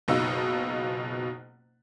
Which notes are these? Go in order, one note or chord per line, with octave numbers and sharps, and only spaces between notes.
F#1 B2 D#4 F4 E6